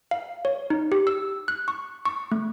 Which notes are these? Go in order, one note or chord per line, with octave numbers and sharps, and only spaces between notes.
F5
C#5
D#4
G4
E6
F#6
C#6
C#6
A3